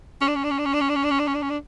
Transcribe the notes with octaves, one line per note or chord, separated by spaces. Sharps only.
C#4
D4
C#4
D4
C#4
D4
C#4
D4
C#4
D4
C#4
D4
C#4
D4
C#4
D4
C#4
D4